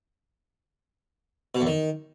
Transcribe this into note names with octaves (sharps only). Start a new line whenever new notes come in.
B2
E2
D#3